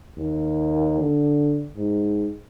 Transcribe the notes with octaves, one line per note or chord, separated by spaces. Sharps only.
D#2
D3
G#2